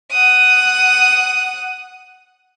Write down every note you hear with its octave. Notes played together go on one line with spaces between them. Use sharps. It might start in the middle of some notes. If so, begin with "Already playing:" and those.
F#5 D#6